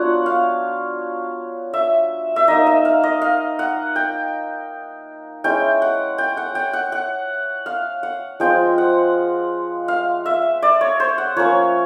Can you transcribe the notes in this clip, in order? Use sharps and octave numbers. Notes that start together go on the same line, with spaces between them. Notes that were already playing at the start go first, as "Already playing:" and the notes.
Already playing: F#3 B3 D4 F4 C#5 F#5
F5
E5
E5
A#3 D#4 D#5
E5
F5
D#5
F5
F#5
G5
G#3 C#4 E4 G5
F#5
G5
F#5
G5
F#5
F#5
F5
F#5
F3 G#3 C4 F4 G5
F#5
F5
E5
D5
C#5
C5
F#5
F3 A#3 C#4 C#5